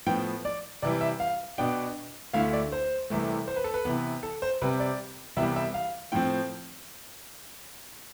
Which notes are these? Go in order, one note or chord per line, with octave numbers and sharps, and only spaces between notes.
A2 F3 B3 G5
D5
C3 E3 G3 D5
E5
F5
B2 B3 D4 G5
D2 D3 A3 E4 F5
D5
C5
C2 C3 E3 A3
C5
B4
A4
B4
C3 E3 B3
A4
C5
C3 G3 C4 B4
D5
C2 C3 E3 G3 B3 E5
E5
F5
A2 F3 C4 G5